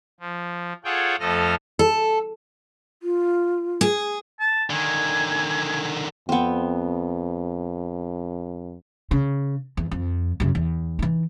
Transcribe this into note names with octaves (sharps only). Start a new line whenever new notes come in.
F3
F4 G#4 A4 C#5 F#5 G5
F2 F3 A3 A4 D#5 F6
A4
F4
G#4
A5
D3 D#3 G#5
F2 B3 C4
C#3
E2
F2
F#2 C#3
E2
E3 D#4